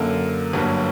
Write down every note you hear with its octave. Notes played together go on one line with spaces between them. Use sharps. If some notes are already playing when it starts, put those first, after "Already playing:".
Already playing: F#2 D3 A#3
G1 G2 F#3 A#3